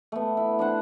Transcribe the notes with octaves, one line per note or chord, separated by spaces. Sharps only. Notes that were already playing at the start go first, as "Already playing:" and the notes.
A3 B3
E4
D4 C5 F#5